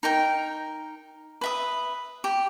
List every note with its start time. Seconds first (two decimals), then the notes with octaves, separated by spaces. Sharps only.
0.03 D#4 A#4 G5
1.41 B4 E5 D#6
2.24 G4